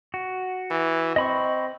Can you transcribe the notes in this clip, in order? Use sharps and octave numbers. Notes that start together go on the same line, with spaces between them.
F#4
E3
C4 D#5 B5 C#6